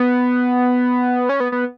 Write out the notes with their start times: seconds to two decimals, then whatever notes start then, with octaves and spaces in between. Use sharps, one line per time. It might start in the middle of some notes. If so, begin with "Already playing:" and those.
Already playing: B3
1.29 C#4
1.40 B3
1.52 B3